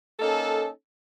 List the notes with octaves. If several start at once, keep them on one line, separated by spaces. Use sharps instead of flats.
A#3 C#4 D#4 A4